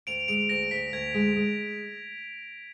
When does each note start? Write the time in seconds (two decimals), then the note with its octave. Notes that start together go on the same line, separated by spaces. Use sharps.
0.07 D2 D7 F7
0.28 G#3 D7 F7
0.49 D2 A#6 D7
0.71 D2 B6
0.93 D2 G#6
1.14 G#3
1.36 G#3